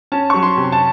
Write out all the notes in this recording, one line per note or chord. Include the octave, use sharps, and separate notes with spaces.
C#4 A5
F#3 C#6
C6
C3
A5